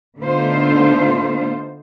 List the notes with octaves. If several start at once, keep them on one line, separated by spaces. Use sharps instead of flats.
D3 A3 B3 D#4 F4 C5